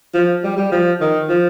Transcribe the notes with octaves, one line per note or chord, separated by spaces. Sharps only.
F3
G3
G3
F3
D#3
F3